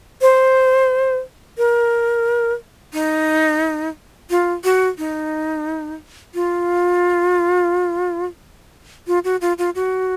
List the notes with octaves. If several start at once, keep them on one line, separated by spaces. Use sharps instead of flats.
C5
A#4
D#4
F4
F#4
D#4
F4
F4
F#4
F4
F4
F#4